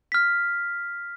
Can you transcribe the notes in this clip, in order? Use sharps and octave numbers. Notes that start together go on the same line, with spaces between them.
F6 B6